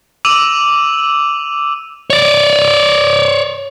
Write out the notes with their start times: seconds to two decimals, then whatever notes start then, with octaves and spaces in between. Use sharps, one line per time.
0.25 D6 E6 D#7 F7 F#7
2.10 C#5 D5